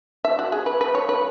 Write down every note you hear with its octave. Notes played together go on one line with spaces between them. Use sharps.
E5
F#4
G#4
B4
B4
C#5
B4